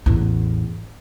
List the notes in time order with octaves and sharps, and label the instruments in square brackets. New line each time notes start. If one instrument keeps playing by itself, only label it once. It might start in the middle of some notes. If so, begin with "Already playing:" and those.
[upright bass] A1 E2